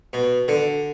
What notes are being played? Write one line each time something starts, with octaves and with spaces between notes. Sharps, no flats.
B2
D3